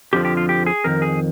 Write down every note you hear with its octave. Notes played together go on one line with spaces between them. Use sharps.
F2 D3 F3 G4
G4
F4
G4
G#4
F2 D#3 A#4
G#4